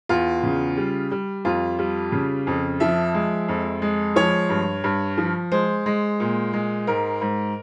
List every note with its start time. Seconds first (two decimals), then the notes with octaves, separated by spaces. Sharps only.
0.09 E2 F4
0.43 C#3
0.77 G3
1.11 G3
1.45 F2 F4
1.79 G3
2.12 C#3
2.47 F2
2.80 F3 E5
3.14 G#3
3.48 F2
3.82 G#3
4.16 F3 C#5
4.50 G2
4.84 G2
5.18 F3
5.52 G#3 C5
5.86 G#3
6.20 A#2
6.53 G#3
6.87 G#2 A#4
7.21 G#2